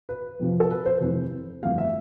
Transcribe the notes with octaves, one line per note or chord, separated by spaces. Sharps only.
B4
F2 C3 F3
A4
B4
C5
F1 F2 E3
G1 F2 E3 A3 F5
E5